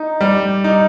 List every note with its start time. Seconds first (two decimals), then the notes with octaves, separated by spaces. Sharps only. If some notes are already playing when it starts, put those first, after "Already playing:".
Already playing: D#4
0.21 G3
0.64 D#4